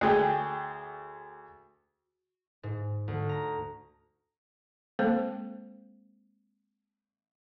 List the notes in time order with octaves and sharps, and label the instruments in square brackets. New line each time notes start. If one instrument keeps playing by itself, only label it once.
[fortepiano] D2 G#4 G5
[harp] G#2
D2
A#5
[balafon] G#3 A#3 C4 A4 C5